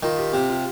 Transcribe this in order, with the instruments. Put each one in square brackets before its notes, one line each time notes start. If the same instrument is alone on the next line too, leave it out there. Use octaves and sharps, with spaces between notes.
[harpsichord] D#3 [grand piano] F4
[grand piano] G4
[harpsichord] C3 [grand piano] G4
[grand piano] F4